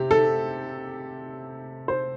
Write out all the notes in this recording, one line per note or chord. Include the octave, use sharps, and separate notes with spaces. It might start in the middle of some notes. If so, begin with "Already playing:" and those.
Already playing: C3 G4
A4
C5